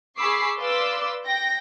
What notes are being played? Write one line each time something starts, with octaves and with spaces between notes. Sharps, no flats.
G#4 B5 C#6 D6 E6 C7
B4 D5 F5 C6 D6 E6
G5 A#6